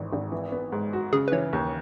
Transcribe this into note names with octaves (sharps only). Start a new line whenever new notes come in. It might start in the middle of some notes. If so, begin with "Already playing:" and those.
Already playing: G#1 G#2 E3
G#1
E3
B3
G#2
F#4
C#3 G#4
B4
E3 C#5
D#2